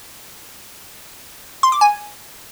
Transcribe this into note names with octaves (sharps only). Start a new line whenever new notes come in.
C6
D6
G#5